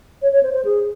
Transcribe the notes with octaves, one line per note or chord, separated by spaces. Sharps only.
C#5
C#5
C5
C5
G#4